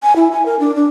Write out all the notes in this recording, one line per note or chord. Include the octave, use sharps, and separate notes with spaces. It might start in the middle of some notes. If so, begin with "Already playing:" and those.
G#5
E4
G#5
A#4
D4
D4